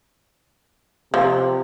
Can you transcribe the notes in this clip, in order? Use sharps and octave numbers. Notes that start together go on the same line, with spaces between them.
C3 F3